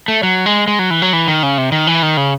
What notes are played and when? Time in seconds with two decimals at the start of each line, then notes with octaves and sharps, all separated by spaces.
0.08 A3
0.23 F#3
0.46 G#3
0.67 G#3
0.79 F#3
0.90 E3
1.02 F#3
1.13 E3
1.28 D#3
1.43 C#3
1.58 C3
1.72 D#3
1.87 E3
2.03 D#3
2.17 C#3